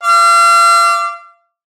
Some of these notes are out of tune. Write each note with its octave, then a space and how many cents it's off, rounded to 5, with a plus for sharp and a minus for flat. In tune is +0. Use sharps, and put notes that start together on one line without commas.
F5 -35 D6 +0